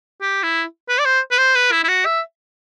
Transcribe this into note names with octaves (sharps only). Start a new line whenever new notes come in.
G4
E4
B4
D5
C5
B4
C5
B4
E4
E4
F#4
E5